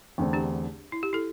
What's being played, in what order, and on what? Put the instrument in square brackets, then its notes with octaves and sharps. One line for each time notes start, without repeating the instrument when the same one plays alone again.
[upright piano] E2 D3 A3 C4
[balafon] D4 G4
E4
G4
E4 A4